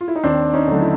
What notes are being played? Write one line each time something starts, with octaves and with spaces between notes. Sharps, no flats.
F4
E4
D#4
D#2 C4 D4
C#4 D#4
D3 F#3 A3
E4